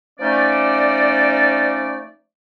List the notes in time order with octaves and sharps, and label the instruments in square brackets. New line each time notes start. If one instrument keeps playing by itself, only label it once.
[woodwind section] F3 A3 C#4 D#4 D5